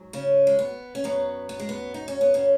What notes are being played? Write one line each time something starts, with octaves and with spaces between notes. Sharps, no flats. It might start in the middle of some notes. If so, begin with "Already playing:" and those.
Already playing: G#2 F#3
C#3 C#4
G#3
B3
C#4
F#2 F#3 B3
B3
G#3
B3
D#4
C#4
B3
C#3 C#4